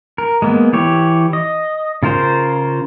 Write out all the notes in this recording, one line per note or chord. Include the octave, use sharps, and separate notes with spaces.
A#4
G#3 A#3 B3
E3 G4 C#5
D#5
C#3 F4 A#4 C5